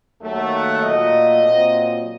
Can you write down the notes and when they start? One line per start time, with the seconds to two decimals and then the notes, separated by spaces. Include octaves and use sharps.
0.22 D#2 D#3 F#3 A3
0.52 F#5
0.82 A#2 F#3 A3 D#5
1.41 A#2 F#3 C4